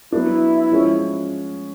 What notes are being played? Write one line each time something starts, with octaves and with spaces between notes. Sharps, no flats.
F#3 B3 D4 E4
F3 G#3 C#4